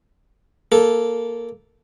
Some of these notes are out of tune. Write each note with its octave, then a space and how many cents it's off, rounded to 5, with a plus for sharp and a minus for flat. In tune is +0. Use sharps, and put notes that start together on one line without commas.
A#3 +0 A4 -10